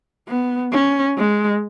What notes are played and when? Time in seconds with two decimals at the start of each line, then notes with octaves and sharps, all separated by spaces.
0.28 B3
0.72 C#4
1.17 G#3